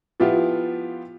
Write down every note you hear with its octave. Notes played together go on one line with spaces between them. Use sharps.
F3 B3 E4 F4 G4